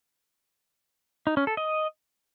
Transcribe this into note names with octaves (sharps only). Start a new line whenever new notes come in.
D#4
C#4
A4
D#5